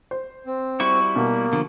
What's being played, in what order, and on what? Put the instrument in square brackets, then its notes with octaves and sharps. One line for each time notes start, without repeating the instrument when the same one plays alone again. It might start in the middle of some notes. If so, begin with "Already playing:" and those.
[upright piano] C5
[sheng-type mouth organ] C4
[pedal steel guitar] G3 E4 F#4 [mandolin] C#6
[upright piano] B2 [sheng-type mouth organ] A#3
[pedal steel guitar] D3 F3